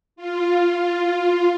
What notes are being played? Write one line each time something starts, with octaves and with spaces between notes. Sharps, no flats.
F4